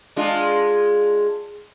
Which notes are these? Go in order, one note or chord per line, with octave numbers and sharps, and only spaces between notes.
G#3 D4 F4